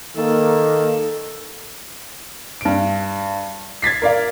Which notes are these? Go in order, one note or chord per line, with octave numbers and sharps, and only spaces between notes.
D#3 A#3 A4
G2 D7
G#6 A6 B6 C7
A#4 D5 F5